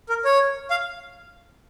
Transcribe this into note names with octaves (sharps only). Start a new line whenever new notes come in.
A#4
C#5
F5